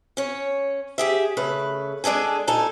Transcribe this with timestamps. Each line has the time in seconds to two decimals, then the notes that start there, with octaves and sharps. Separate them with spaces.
0.17 C#4 C#5
0.98 G4 G#4 E5
1.37 C#3 A3 B4
2.04 G#3 D4 G#4 A4 G#5
2.47 A#2 D#4 A4 G#5